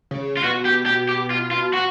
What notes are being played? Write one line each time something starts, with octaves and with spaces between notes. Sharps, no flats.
C#3
F4
B2 F#4
G4
G4
G4
F4
F4
F#4